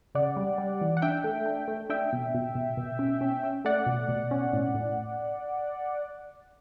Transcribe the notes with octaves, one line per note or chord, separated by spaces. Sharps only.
C#3 D5 F#5
G3
G3
E3
F#5
D4 E5 G5
A3
D4
A3
D4 E5 G5
B2
B2
B2
B2
C#4
C#4
C#4
A3 D5 F#5
B2
B2
C#4
A2
A2